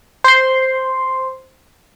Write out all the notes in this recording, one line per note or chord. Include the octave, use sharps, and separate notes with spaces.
C5 C6